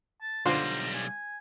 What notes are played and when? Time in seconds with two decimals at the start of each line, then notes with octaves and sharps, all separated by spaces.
0.21 A5
0.46 B1 D3 G3 F4 C5 A#5
0.93 G#5